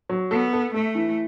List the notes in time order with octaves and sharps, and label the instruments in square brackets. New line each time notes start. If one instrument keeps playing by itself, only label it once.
[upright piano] F#3
[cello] B3 [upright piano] A4
[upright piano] A4
[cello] A3 [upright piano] A4
[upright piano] E3